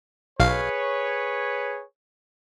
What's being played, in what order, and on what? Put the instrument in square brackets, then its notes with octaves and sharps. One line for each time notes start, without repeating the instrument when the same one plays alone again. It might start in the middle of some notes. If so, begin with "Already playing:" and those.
[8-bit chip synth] B1 F5 [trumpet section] G#4 B4 C#5